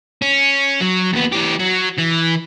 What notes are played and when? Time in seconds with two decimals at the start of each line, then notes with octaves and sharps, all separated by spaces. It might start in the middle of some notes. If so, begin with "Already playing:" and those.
0.22 C#4
0.81 F#3
1.13 D#2 B3
1.32 E3 G4
1.59 F#3
1.98 E3